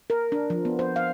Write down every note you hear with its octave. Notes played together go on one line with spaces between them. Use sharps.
A#4
D4
F3
B3
C5
F5